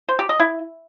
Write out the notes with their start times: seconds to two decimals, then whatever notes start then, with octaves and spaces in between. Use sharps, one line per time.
0.09 C5
0.19 G4
0.29 D#5
0.40 E4